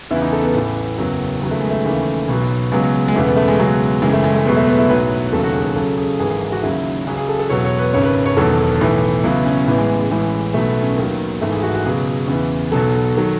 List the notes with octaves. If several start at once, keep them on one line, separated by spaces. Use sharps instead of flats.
E2 C#3 E3 E4
D#4
A4
B3
A1 A2 E3
F#1 E2 C#3 F#3
D#2 C#3 F#3 B3
A3
G#3
A3
D#2 C#3 E3
B1 B2 F#3 B3
C#2 B2 F#3 G#3
G#3
E1 E2 C#3 E3 A3
B3
A3
G#3
C#2 B2 F#3
F#1 F#2 C#3 E3 G#3
A3
G#3
A3
E2 B2 F#3 G#3
A3
B3
E4
B1 A2 F#3 B4
E1 D#2 C#3 F#3 A4
F#4
G#4
A4
C#2 C#3 F#3 A4
G#4
G#1 G#2 E3 G#4
G#4
G#4
F#4
D#2 C#3 F#3 E4
C#2 C#3 F#3 G#4
G#4
A4
A4
E1 E2 B2 F#3 C#5
C#5
B4
G#1 F#2 C#3 C#5
B4
C#5
E1 E2 D#3 F#3 A4
B1 A2 E3
C#2 B2 F#3 E4
C#4
A1 A2 E3 B3
G#3
G#3
A1 A2 E3 G#3
B1 B2 F#3 A3
B3
C#4
D#2 D#3 F#3 B3
G#1 G#2 E3 A3
G#4
F#4
F#4
C#2 B2 F#3 G#4
E2 C#3 E3
B1 B2 F#3 A4
D#3 F#3